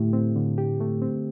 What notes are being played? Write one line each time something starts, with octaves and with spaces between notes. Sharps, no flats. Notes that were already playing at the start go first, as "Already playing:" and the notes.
Already playing: A2 D3 A3 G4
C4
D3
G4
A3
C4